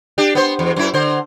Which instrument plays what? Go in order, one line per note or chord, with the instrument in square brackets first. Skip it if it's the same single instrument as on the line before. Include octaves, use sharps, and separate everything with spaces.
[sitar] D4 G4
B3 C5
E2
F#2 E4
D3 C5